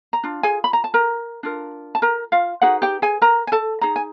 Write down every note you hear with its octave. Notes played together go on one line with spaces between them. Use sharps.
A#5
D4 F4
G#4 G#5
B5
A#5
A5
A#4 A#5
D4 F4 A#4
A5
A#4 A#5
F4 F5
D#4 F#4 G#4 B4 F#5
G4 G5
G#4 G#5
A#4 A#5
G#5
A4 A5
D#4 G#4 A#5
G#5